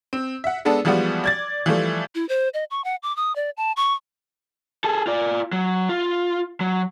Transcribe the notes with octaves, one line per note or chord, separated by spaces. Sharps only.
C4
E5 F#5
G#3 B3 D4 A4
E3 F3 G3 G#3 B3 F#4
D5 G#6 A6
E3 F3 G3 A3
E4
C5
D#5
C#6
F#5
D6
D#6
D5
A5
C#6
G#4 A4
F4 D5
F#3
F4
F#3